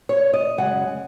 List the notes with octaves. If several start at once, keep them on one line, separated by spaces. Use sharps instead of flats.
C#5
D#5
F#2 C#3 G#3 C#4 F#5